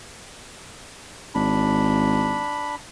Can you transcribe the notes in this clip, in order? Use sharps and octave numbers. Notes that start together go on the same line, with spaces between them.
G#1 D4 B5